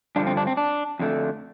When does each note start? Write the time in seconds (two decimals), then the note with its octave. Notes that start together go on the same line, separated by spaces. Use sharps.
0.16 G2 D3 F3 D4
0.27 C4
0.37 D4
0.47 C4
0.57 D4
0.99 F2 D3 A3